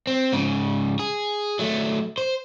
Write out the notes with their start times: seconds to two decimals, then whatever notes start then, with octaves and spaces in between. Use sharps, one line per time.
0.07 C4
0.33 G#2 C#3
0.99 G#4
1.59 F#3 A3
2.18 C5